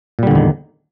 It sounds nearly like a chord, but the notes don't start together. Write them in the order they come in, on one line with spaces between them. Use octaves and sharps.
A#2 G3 D3 E2 D#3